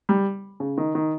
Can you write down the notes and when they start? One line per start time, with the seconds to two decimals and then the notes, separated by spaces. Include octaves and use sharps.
0.09 G3
0.60 C#3
0.78 D#3
0.95 D#3